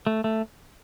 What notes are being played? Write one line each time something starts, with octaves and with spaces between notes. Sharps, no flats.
A3
A3